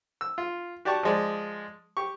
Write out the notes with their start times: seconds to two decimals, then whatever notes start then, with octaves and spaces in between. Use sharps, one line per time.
0.21 E6
0.38 F4
0.85 F#4 G4 D5 A5 C#6
1.03 F3 G#3 D5
1.97 G4 C#6